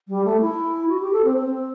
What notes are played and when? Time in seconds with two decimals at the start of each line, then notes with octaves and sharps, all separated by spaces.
0.08 G3
0.24 A3
0.40 E4
0.88 F#4
1.00 G4
1.13 A4
1.24 C4
1.37 C4